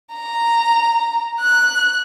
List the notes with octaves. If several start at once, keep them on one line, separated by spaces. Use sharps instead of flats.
A#5
F#6